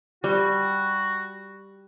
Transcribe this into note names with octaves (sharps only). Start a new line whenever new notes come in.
G3 F#4